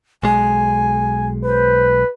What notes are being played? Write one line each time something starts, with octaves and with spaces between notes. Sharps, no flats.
B1 G#3 G#5
B4 C5